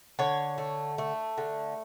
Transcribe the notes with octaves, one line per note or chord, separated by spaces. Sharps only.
D3 C#5
A3
A3
D3